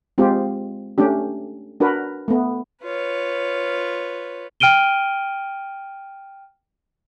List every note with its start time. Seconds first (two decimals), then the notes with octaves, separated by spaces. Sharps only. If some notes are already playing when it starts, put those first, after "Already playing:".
0.18 G#3 C4 F4 G4
0.98 A3 C#4 D4 G4
1.80 D4 F#4 A#4 B4
2.28 A3 B3
2.84 F4 B4 C#5
4.60 G5 F6 D7 D#7 G7